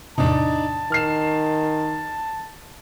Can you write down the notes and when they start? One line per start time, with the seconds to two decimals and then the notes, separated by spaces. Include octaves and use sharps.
0.18 E2 A2 C3 D4 D#4 A5
0.92 D#3 F6 C7 E7